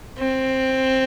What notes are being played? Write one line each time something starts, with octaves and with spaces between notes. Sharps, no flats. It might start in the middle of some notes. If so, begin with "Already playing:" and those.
C4